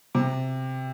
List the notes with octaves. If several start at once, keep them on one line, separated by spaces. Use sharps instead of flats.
C3